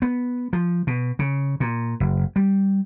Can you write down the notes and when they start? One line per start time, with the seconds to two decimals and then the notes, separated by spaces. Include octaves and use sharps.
0.02 B3
0.53 F3
0.87 B2
1.19 C#3
1.60 A#2
2.00 F#1
2.36 G3